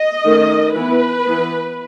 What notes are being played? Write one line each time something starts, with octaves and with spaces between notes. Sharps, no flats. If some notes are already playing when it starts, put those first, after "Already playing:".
Already playing: D#5
D#3 A3 C#4
E3 B3 B4
E3 B3